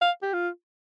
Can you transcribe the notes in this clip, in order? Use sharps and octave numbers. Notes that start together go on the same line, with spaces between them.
F5
G4
F4